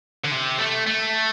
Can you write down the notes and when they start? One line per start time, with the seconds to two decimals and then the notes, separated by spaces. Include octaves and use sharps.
0.25 D3
0.32 C3
0.59 A3
0.87 A3